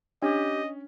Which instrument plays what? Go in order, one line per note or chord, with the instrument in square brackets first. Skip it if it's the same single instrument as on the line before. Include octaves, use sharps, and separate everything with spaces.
[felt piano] C#4 [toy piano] D4 [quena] G4 [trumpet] D#5